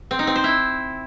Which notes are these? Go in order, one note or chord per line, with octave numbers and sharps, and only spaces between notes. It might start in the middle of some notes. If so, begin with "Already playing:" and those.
C4
D#4
C4
C5
E4